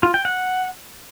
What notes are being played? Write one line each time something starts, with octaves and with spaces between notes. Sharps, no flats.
F4
G5
F#5